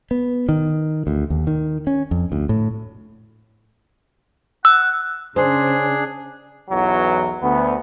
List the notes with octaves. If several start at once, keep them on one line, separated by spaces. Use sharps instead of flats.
B3
D#3
D2
D#2
D#3
C#4
F2
D2
A2
F#5 E6
C#3 D4 G#4 C5
B1 E2 E3 F#3
D2 B3